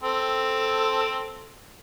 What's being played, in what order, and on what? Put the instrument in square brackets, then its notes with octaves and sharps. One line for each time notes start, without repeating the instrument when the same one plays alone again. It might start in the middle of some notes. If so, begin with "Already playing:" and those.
[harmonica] C4 A4